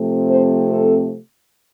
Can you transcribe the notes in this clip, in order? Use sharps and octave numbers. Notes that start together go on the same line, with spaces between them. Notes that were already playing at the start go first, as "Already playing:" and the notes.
Already playing: C3 F3 A3 C4
C5
A4